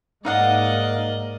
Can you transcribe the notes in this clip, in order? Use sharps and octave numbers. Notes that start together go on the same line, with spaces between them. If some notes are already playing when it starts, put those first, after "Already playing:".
G#2 A#3 D#4 D5 D#5 F5 F#5